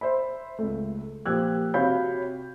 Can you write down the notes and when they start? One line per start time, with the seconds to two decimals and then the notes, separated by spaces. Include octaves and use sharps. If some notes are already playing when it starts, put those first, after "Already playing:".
0.01 C5 E5 B5
0.59 C#2 A3
1.26 A#2 F3 G4 E6 F#6 G#6
1.74 C3 F#4 C#5 F5 B5 G6